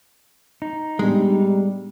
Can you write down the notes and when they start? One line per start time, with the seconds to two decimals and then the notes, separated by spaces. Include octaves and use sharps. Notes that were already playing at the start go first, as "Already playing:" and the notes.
0.62 D#4
0.99 A2 G3 G#3 B3 D4